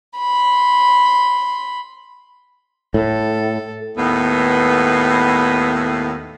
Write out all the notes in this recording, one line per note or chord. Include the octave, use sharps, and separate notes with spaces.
B5 C6
A2 A4
D#2 A2 B3